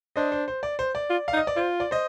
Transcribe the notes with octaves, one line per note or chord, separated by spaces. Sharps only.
D4 C5 D#5
C5
C5
D5
C5
D5
F4
F5
D#4
D#5
D5
F4 C5
D5
C5 D#5